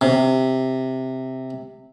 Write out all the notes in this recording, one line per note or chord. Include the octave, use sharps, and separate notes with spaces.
C3